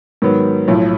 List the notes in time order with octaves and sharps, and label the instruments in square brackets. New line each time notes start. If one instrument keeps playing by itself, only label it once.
[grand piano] G#2 D#3 F#3 B3
B1 A2 F3